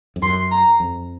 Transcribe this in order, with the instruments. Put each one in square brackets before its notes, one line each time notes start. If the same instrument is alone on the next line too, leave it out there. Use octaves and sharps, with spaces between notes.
[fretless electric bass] F2
[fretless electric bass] F#2 [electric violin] C6
[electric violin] A#5
[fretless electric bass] F2